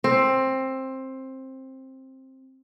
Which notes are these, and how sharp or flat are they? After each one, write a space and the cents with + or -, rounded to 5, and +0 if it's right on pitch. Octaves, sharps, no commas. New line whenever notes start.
C4 +15